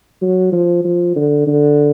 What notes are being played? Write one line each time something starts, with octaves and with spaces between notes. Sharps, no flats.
F#3
F3
F3
D3
D3